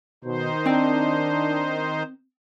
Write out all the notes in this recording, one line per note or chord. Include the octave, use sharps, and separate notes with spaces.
B2 D#3 D#4 C5
C4 D4 G5